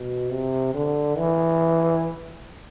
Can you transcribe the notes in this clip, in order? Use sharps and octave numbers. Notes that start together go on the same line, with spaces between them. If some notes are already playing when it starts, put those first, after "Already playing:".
Already playing: B2
C3
D3
E3